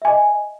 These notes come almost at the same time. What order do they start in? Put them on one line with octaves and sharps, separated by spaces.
E5 G#5 D#5